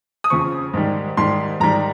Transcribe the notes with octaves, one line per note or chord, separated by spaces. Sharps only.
D#6
F2 C#3 F3 C#6
G#2 D#3 G3
G#2 D#3 G3 C6
G#2 D#3 G3 A#5